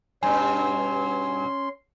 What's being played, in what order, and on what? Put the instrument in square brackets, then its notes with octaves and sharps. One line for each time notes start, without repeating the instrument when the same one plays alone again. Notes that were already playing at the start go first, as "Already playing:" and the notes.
[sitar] G2 B2 [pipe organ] C#4 C6 [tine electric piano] G#5